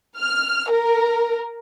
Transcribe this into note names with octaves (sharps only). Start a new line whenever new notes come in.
F6
A#4